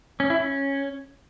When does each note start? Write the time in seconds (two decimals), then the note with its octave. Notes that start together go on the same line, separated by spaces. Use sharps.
0.20 C#4
0.30 E4
0.40 C#4